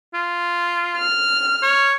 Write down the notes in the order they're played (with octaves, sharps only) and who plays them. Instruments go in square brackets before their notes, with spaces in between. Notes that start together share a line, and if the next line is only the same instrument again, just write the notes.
[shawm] F4
[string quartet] F6
[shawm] C#5